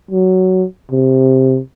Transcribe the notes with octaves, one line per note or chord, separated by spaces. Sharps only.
F#3
C3